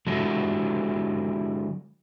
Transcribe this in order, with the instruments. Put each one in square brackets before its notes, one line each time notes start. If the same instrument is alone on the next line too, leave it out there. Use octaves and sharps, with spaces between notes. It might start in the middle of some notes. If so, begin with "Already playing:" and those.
[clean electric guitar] D3 F#3 G#3 E4 F#4 A4